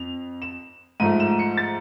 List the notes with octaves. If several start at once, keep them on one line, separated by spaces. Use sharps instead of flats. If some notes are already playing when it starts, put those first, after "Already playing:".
Already playing: F2 F7
E7
G#2 F3 A3 D#7
E7
C#7
A6